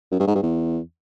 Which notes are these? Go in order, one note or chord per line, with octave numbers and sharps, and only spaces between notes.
F#2
G2
G#2
G2
E2